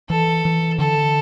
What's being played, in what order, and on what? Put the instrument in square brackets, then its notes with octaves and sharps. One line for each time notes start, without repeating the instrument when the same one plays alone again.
[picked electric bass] E3 [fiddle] A4
[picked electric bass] E3
[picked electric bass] D3 [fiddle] A4